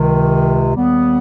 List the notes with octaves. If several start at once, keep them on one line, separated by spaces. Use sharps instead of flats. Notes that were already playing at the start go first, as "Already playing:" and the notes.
Already playing: C#2 C3 D#3
D#2 D#3 G3 B3